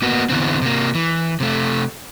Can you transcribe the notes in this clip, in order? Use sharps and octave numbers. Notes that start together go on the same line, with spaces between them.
A#3 B3 F#4
E2 G2 D3 E3 B3 C4
C3 A#3
E3
C3 A3